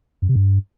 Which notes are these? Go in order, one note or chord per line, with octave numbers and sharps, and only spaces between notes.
F#2
C3
G2